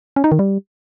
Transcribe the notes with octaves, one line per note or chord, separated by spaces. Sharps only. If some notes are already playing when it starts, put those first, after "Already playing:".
C#4
D#4
D#3
G3